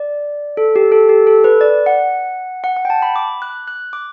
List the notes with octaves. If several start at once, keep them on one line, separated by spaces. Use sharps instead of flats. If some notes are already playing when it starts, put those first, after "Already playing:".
Already playing: D5
A4
G4
A4
G4
A4
B4
D5
F#5
F#5
F#5
G5
A5
B5
D6
F#6
F#6
D6